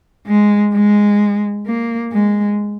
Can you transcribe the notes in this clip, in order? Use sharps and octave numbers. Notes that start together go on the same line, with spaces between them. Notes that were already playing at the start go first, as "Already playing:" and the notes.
G#3
G#3
A#3
G#3